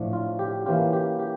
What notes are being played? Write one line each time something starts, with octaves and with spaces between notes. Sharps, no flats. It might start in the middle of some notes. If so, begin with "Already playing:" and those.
Already playing: A2 F3 A3 D4
F4
G4
E3 A#3 C#4 F4 G4
G4
G4